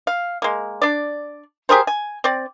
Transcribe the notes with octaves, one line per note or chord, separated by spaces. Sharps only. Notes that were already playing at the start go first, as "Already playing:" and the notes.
F5
G#3 A#3
D4 D5
G4 G#4 A#4 C5
G#5
C4 D5